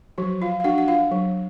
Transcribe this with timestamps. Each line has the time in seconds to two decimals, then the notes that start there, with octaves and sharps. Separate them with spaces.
0.18 F3 F#3 F#4
0.42 F4 F5
0.60 F5
0.64 D4 F#4 F#5
0.78 F#5
0.88 F4 F5
1.11 F#3